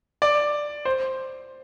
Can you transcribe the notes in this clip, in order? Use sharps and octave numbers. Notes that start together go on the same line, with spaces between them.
D5
C5